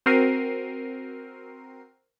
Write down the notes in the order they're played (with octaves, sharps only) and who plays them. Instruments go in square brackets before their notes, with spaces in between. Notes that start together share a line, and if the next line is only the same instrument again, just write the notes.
[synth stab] C4 F#4 A#4 C7 D#7